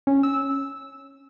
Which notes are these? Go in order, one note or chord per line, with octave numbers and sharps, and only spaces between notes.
C#4
E6